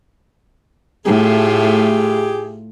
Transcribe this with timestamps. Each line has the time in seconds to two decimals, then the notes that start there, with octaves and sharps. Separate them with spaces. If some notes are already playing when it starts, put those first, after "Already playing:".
1.06 A2 A3 F4 G4 G#4